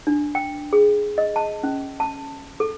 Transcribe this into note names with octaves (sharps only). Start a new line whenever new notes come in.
D4
G5
G#4
D#5
A5
C#4
A5
A4